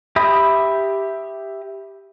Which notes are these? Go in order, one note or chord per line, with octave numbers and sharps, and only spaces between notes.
G4 E5 B5 D#6